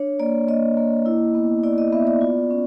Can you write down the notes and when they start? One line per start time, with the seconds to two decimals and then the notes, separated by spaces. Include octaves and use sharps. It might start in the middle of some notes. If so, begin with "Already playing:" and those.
Already playing: D4 C#5
0.19 A#3 D5
0.48 A#3 D#5
0.77 A#3
1.06 E4
1.35 B3
1.64 E4 D5
1.78 D#5
1.92 B3 E5
2.07 D5
2.21 F4
2.51 C#4